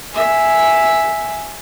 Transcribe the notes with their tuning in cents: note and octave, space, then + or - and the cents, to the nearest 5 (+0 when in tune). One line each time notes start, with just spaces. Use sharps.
E5 +0 G#5 +0